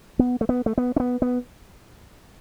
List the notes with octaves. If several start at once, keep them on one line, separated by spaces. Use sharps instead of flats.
B3
A3
B3
A3
B3
C#4
B3
B3